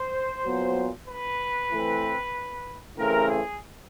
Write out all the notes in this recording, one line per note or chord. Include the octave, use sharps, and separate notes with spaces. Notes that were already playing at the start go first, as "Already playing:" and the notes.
Already playing: C5
A#2 F#3 B3
B4
E3 A3 C4
C#3 E3 A3 C4 A#4
G#4